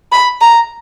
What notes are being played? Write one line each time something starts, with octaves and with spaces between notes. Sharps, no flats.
B5
A#5